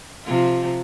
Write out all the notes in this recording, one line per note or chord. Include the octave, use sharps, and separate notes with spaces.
C3 F3 F4